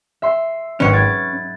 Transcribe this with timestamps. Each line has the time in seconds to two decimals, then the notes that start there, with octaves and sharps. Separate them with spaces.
0.22 E5 C6
0.80 G#1 F#3 C#4 B4 C#5
0.93 G#6 A6 D7